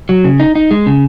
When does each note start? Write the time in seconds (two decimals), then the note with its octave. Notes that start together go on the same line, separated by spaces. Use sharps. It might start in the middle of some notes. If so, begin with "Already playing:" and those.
0.09 F#3
0.24 C#3
0.40 D#4
0.55 D#4
0.71 G#3
0.86 C#3